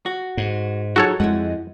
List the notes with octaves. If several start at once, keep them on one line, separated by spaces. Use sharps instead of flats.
F#4
G#2
F#3 D#4 F4 F#4 G#4 A4 C#5
F2 G#3 E4 F#5